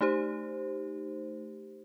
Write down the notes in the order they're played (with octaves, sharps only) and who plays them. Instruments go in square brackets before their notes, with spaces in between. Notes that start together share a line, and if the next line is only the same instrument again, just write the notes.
[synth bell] A3 D#4 G4 C5